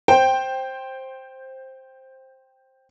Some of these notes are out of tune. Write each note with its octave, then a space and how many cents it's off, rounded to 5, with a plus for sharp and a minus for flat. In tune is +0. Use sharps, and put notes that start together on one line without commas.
C5 +10 G5 +0